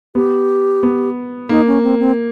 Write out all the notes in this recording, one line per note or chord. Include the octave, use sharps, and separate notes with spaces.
B3 G4
B3
A#3 D#4
C#4
C4
C4